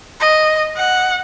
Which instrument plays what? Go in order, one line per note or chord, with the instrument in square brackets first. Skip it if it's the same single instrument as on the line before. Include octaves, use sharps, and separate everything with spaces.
[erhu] D#5
F#5